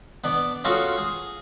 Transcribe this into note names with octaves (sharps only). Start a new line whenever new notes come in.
B3 D4 D5
C#4 F4 F#4 G#4 A4
G#4